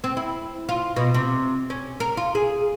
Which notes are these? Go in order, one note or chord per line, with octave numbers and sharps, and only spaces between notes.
C4
E4
F4
B2
C3
C#4
A#4
F4
G#4